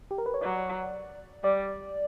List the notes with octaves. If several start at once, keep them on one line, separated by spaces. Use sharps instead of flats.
G4
A#4
B4
C#5
F#3 D5
G3 D5